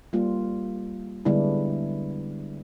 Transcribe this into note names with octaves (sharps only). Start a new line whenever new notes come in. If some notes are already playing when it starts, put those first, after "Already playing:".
G3 A#3 F4
D3 G3 G#3 B3 D4 E4